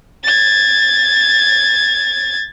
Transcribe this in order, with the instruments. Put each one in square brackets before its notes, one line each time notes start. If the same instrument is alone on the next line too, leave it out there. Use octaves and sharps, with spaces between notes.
[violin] G#6 A6